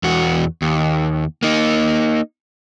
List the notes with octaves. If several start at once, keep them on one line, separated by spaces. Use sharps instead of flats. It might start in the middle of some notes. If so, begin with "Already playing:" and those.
E2 F#4
D#2
A#3 D#4